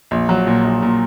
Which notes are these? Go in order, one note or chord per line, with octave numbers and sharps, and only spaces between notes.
A#1
F#3
A#2
A#1
A#2